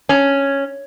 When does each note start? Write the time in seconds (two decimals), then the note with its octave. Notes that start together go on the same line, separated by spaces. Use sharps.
0.09 C#4